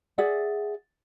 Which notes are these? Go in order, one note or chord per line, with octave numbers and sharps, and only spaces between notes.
G#4 D5 E5 F#5